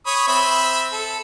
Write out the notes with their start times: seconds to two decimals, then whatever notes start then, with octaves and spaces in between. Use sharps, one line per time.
0.06 C#5 B5 D#6
0.28 C4 E5 B5
0.92 A4